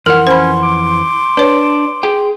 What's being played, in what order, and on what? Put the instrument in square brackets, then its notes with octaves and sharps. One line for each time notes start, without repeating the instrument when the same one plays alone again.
[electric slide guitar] F2 E3 F#5 [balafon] A#4 [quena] C6 [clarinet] F6
[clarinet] C#4 [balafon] C5 B5
[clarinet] D6
[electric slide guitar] D4 [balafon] B4 C#5
[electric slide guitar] G#4 G5